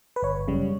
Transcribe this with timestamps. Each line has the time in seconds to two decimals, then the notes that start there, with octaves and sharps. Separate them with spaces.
0.16 B4
0.23 G1 C#5
0.48 F#2 C#3 G3